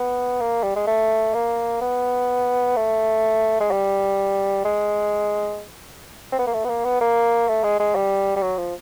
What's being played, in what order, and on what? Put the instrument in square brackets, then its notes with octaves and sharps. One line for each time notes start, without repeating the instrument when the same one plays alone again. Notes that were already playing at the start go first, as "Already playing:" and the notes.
Already playing: [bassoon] B3
A#3
G3
G#3
A3
A#3
B3
A3
G#3
G3
G#3
C4
B3
A#3
A3
B3
A#3
B3
A#3
A3
G#3
G#3
G3
G3
F#3
F3